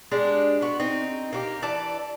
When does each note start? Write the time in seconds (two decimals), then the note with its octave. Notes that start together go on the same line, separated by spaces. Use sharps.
0.12 G#3 D4 G4
0.61 B3 F#4
0.80 C4 D#4
1.33 A#3 F#4 G4
1.62 E3 D5 A5